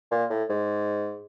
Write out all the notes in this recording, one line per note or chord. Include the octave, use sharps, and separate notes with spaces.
A#2
A2
G#2